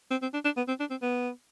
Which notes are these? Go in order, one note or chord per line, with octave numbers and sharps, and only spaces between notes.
C4
C4
D4
D4
B3
C4
D4
C4
B3